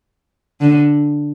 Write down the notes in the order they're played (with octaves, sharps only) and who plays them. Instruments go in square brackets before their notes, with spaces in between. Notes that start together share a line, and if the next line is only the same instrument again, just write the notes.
[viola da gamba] D3